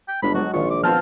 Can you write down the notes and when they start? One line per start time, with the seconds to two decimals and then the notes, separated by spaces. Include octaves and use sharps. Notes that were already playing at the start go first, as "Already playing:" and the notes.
0.08 G5
0.23 G1 G#3 D4 B5
0.35 F#3 G#3 F#4
0.54 A#1 D#3 F4 C#6
0.70 D6
0.83 F3 B3 C4 F4 G5 A5 F6